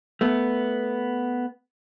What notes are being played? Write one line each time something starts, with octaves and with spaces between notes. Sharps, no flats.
A3 B3